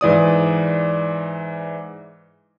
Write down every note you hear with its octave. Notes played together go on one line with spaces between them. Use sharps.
G#2 E3 D5 D#6